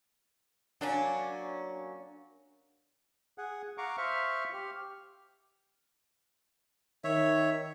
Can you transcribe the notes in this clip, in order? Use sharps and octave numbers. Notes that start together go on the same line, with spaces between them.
F#3 A#3 C#4 D4
G#4 F#5
F5 F#5 A#5 C#6 D6
C5 E5 F5 C#6 F6
G4 F6
D#3 C#5 E5